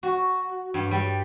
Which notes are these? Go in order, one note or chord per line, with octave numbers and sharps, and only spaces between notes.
F#4
G2
G3